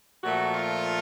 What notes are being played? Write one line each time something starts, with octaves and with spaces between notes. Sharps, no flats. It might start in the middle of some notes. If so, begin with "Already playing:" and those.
A#2 F3 A3 F#4
F4